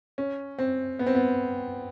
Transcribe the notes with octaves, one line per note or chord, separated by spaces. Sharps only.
C#4
C4
B3
C4
B3